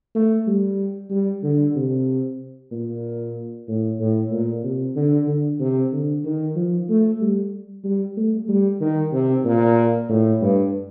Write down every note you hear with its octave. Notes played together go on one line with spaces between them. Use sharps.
A3
G3
G3
D3
C3
A#2
A2
A2
A#2
C3
D3
D3
C3
D3
D#3
F3
A3
G3
G3
A3
G3
D#3
C3
A#2
A2
G2